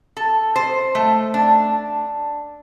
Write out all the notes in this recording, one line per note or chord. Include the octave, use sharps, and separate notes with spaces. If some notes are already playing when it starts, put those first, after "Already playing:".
A4
C5
A3
D4